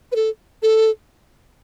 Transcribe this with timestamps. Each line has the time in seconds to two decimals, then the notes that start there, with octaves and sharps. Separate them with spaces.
0.12 B4
0.16 A4
0.62 A4